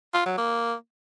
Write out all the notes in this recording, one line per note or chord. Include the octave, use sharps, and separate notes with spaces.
F4
F#3
A#3